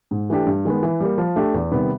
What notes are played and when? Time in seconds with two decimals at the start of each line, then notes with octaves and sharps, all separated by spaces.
0.11 G#2
0.30 E3 A3 D4 G4
0.46 G2
0.65 D#3 G#3 B3
0.83 E3
1.00 G3 A#3
1.18 F3
1.36 A3 D4 G4
1.54 E2
1.71 C3 D#3 G3 B3